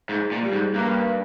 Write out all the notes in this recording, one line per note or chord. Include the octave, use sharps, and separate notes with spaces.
G#2
A#2
G3
G#2
G2 A#3